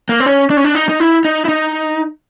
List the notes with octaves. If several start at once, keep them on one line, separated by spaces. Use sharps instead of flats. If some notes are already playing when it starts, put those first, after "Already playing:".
A#3
C4
C#4
D4
C#4
D4
D#4
D#4
E4
D#4
E4
D#4